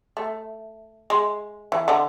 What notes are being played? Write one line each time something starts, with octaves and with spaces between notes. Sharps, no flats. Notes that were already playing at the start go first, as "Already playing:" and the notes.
A3
G#3
E3
D3